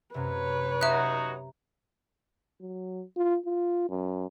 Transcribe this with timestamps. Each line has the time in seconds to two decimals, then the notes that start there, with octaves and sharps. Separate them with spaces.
0.14 F#2 C3 B4 C#5
0.81 F#3 D#4 F#4 G4 E5 A#5 F#6 B6
2.61 F#3
3.17 F4
3.46 F4
3.89 F#2